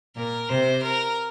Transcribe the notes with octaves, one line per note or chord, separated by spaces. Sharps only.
A#2 A#4
C3 C5
A#4